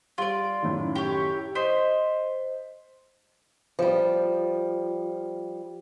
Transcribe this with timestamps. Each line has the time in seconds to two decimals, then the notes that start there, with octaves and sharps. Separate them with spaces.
0.18 G3 F4 D5
0.62 F#2 A2 D#3
0.95 G4 C#5
1.55 C5 D#5 B6
3.79 F3 G3